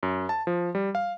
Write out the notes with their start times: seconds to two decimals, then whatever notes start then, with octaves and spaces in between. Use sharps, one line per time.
0.03 F#2
0.29 A5
0.47 F3
0.75 G3
0.95 F5